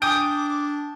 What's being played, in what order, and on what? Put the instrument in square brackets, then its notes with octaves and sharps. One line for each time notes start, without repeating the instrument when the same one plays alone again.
[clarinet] D4 [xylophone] G5 G#5 D#6 [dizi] D6 [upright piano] G6